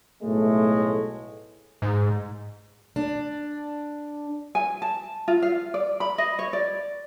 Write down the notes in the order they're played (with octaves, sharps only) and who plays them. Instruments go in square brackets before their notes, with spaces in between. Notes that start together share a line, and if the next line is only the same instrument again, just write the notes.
[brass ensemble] B1 A2 G#3 A3
[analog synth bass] G#2
[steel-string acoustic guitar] D4
[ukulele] G#5
A5
F4
F5
D5
B5
D#5
C#5
D5